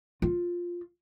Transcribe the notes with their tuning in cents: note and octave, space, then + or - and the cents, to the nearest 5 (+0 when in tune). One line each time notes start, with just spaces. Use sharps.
F4 +5